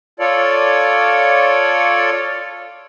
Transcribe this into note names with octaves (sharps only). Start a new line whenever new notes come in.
F4 A4 C#5 D5